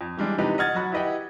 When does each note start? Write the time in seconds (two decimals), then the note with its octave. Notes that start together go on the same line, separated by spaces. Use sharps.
0.01 F2
0.17 E3 G3 G#3 D4
0.38 C3 E3 F3 D#4 G4 B4
0.58 D#5 F#5 F6 G#6 A6
0.75 F#3 F#4 B5
0.92 E4 G4 B4 D#5 F#5 G5